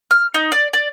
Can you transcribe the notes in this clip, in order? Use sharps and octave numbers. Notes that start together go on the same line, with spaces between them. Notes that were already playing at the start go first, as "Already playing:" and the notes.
F6
D#4
D5
D5